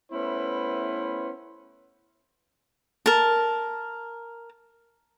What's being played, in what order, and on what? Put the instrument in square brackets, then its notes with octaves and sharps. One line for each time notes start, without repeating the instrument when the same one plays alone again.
[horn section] A3 B3 C#4 E4 B4 C5
[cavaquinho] A#4 A5